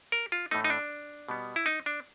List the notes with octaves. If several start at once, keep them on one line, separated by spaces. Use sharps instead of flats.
A#4
F4
A2 E3 A3 D#4
D#4
D4
B2 G3 B3
E4
D#4
D4